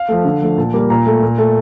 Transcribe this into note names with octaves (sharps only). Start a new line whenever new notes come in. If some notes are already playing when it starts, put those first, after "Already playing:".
Already playing: F5
F3 A3
D3
F3 A3
A#2 A5
G3 A#3
A#2 A#5
A3
A#2
A3